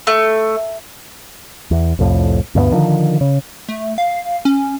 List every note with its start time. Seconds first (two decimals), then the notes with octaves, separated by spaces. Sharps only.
0.07 A3
1.71 E2
1.99 C2 F2 A2
2.55 D2 G2 F#3 B3
2.72 D3 D#3 F3
3.21 C#3
3.68 A3
3.98 F5
4.45 C#4